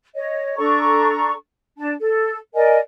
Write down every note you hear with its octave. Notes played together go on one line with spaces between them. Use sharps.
C#5 D#5
D4 A4 A#5 C#6
D4 A5
A4
A#4 D5 D#5 G#5